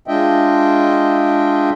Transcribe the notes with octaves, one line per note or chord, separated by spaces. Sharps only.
G#3 D4 F4 D#5 E5 G5